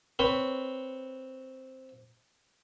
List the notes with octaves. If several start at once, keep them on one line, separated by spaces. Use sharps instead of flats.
C4 B4 C#5